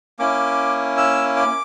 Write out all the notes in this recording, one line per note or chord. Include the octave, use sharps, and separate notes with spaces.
A#3 C#4 E4 D6
E6
D6